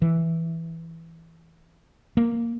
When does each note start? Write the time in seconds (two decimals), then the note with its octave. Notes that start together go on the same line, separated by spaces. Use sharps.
0.02 E3
2.17 A#3